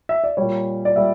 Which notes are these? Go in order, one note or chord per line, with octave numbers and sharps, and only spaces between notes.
E5
D5
A#2 G3 C#5
D5
A#2 G3 E5